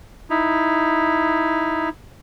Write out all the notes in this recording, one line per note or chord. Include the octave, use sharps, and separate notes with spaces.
D#4 E4